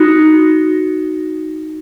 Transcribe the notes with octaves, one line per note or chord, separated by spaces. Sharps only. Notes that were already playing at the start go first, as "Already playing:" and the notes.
Already playing: D#4 F#4